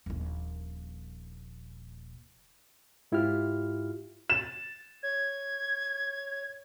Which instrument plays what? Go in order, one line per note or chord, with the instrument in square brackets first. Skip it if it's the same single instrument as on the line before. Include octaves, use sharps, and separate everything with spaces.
[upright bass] D#1 A#1
[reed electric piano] G#2 E4 F4 G4 F6
[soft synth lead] A6 [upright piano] E7
[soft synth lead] C#5 [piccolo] G#6